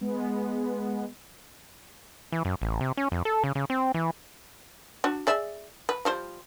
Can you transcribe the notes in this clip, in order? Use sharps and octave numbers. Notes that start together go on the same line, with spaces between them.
G#3 B3
E3
F#2
A1
C3
C#4
F2
A4
C#3
C#3
C4
E3
D4 F#4
G#4 D5 E5
B4
F3 G3 C5